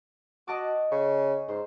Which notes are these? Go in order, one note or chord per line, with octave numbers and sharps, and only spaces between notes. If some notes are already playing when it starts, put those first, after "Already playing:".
F#4 D#5 A5 D6
C#3 C#6
G#2 C5